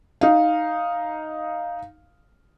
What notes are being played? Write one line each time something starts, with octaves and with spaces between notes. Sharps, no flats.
D#4 F5